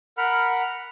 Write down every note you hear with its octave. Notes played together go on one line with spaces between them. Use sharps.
A#4 F#5 B5 F6